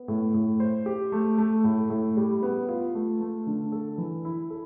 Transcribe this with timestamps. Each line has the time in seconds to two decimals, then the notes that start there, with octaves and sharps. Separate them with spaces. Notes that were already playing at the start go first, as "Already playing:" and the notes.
Already playing: B3
0.08 A2
0.34 A2
0.60 C5
0.86 G4
1.12 A3
1.38 A3
1.64 A2
1.90 A2
2.17 G3
2.43 B3
2.69 F4
2.95 A3
3.21 A3
3.47 D3
3.72 A4
3.98 E3
4.25 E4
4.50 A4